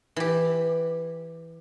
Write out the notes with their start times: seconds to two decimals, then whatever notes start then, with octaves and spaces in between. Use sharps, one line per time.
0.16 E3 G4